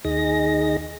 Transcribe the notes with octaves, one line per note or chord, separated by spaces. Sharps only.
D#2 D#4 G#4 A#6